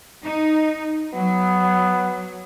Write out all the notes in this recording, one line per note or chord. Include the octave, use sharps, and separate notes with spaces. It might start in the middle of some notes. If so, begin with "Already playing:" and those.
D#4
F#3 B3